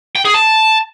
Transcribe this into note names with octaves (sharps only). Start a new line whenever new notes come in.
G5
G#4
A5